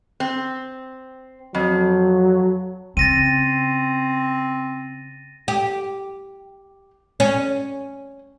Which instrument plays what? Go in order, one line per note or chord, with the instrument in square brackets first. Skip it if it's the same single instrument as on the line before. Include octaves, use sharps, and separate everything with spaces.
[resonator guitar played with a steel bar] C4
[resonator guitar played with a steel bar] F2 [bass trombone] F#3
[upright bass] C#3 [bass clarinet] C4 [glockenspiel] A6 A#6 D#7
[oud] G4
C#4